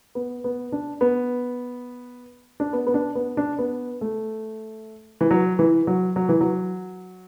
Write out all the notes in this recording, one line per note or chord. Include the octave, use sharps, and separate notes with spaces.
B3
B3
D4
B3
D4
B3
B3
D4
B3
D4
B3
A3
E3
F#3
E3
F#3
F#3
E3
F#3